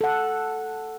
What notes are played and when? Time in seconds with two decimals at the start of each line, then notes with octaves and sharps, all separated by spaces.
0.01 A4 F#5